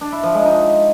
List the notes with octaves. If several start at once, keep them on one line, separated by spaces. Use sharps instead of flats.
D4
E4
F3
G#3
D#4